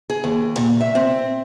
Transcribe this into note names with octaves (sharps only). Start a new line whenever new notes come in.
G#4
D#2
A#2
E5
C4